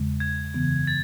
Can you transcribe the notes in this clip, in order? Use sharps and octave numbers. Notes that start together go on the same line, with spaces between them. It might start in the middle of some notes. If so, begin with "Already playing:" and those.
Already playing: E2 C#3 G#3
G#6
F#2 C#3 E3 B3
A6